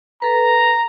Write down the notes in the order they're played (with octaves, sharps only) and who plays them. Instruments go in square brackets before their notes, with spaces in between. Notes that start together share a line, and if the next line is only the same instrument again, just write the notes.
[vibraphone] A4 B4 [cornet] A#5